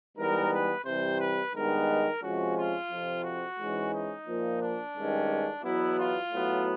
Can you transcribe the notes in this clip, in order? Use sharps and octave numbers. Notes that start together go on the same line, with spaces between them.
G#2 E3 G3 B3 A#4
B4
C3 E3 G3 C5
B4
G2 D#3 G#3 B3 A#4
C3 F3 G#3 C#4 F#4
F4
F2 C3 F3
F#4
G#2 E3 G#3 C#4
D#4
A#2 F3 A#3
D4
G2 D#3 G#3 C#4
E2 B2 F#3 B3 E4
F4
A2 F#3 B3